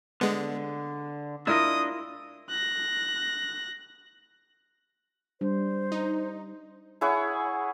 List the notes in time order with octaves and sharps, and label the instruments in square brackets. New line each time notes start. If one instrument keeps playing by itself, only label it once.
[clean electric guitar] D3 [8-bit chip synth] G#3 B3
[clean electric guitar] D4 D#5 [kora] E4 F4 A#4 [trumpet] D#6
[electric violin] F#6 A#6
[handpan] G3 D4 [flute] C5
[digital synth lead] D#4
[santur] E4 G#4 C#5 F#5